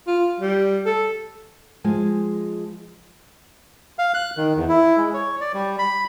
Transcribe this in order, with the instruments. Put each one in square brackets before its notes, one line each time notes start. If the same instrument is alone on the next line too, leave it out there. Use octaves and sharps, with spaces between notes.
[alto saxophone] F4
G3
A4
[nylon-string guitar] F3 G#3 G#4 G#5
[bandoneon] F5
F#6
D#3
E2
E4
G#3
C#5
D5
G3
B5